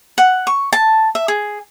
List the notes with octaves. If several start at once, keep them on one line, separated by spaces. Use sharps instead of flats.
F#5
C#6
A5
E5
G#4